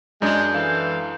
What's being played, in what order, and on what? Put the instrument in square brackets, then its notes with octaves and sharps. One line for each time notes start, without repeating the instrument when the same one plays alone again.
[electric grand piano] F#2 D4 D#6 [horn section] G#3 [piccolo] G6
[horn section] E3 A4 F5